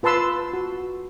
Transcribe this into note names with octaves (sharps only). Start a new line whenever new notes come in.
F4 B4 A5 C6 E6
F#4